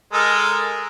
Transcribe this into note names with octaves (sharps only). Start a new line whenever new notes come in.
G#3 A4 A#4